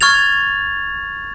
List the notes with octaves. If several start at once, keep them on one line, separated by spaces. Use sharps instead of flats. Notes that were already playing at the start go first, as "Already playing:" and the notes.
C#6 F6 G#6 A6 F7